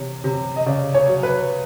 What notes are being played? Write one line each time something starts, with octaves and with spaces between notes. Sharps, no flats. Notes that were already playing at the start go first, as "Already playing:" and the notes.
Already playing: C3 E3 C#5
C3
D#5
C#3 D5
C#5
F#3
B4